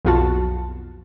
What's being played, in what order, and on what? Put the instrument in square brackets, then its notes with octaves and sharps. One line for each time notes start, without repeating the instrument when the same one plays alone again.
[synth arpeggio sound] B1 F2 F4 F#4 A5